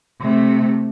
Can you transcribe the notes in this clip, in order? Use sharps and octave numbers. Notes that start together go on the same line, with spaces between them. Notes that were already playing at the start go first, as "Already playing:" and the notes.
C3 A3